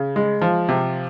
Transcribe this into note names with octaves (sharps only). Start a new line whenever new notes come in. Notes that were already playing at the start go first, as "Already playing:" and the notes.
Already playing: C#3
G#3
F3
C3